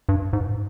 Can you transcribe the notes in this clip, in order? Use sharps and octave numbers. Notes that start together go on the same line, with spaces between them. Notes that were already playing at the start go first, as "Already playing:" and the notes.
G2
G#2